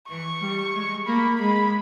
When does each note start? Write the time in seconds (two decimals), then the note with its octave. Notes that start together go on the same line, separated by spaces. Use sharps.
0.08 E3 C#6
0.41 G3
0.74 G#3
1.06 A#3 B5
1.39 G#3 B5